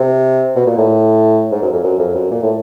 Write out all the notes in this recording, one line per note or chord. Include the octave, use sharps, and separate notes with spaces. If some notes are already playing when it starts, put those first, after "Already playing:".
Already playing: C3
B2
A#2
A2
G#2
F#2
F2
F#2
F2
F#2
A#2
A2